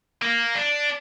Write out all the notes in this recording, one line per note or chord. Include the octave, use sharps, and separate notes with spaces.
A#3
D4